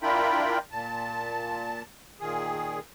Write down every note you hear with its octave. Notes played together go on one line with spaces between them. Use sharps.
D4 E4 F4 A#4 G5 B5
A#2 A5
A#2 D#3 G#4